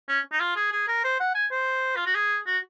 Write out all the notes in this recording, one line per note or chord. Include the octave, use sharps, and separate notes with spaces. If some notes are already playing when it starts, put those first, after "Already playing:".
C#4
D#4
F4
G#4
G#4
A#4
C5
F#5
G#5
C5
F4
F#4
G#4
F#4